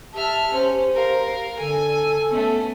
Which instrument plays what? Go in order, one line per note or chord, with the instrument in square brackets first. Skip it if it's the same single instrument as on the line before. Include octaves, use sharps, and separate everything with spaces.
[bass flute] G4 [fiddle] E5 F6 [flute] A5
[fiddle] C#4 [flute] C5
[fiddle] A#4 F5
[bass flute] D3 [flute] A4 [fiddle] G#5
[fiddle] A3 C#4 [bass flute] B3